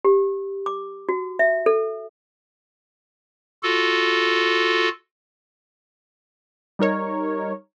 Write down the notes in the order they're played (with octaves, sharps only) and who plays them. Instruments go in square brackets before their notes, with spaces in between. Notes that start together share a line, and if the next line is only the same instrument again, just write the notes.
[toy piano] G4
D6
F#4
E5
A4
[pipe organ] F4 F#4 A4
[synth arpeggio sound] G3 D#4 A#4 C#5